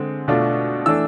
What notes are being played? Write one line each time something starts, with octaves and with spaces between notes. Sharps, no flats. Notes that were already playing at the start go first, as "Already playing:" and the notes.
Already playing: D3 G#3 C4
B2 A3 D4 F4
E3 A3 D4 E6